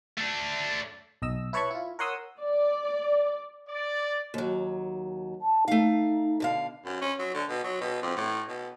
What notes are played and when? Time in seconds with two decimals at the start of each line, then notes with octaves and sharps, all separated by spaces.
0.18 A3 D4
1.22 B1 D#5 E6
1.53 E4 B4 C#5 A5 B5 C#6
1.70 E4 F4
1.99 A#4 C#5 F#5 C6 D#6 E6
2.40 D5
3.69 D5
4.34 D#2 F#3
5.41 A5
5.68 A3 D#4 F5
6.40 B2 D3 F5
6.85 F#2
7.01 C#4
7.19 F#3
7.34 D3
7.49 B2
7.64 F#3
7.81 B2
8.02 F2
8.16 A2
8.48 B2